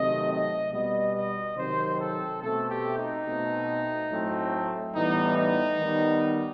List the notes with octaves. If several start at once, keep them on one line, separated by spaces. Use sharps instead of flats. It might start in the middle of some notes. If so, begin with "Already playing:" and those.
Already playing: C3 D#3 F#3 A3 C4 D#5
D#5
B2 G3 B3 D#5
D#5
C3 D#3 F#3 C4 C5
A4
B2 A3 C4 A4
G4
D#4
B2 A3 C4
A2 F#3 A3 C4
A2 E3 G3 B3 D#4
D#4
D#3 G3 B3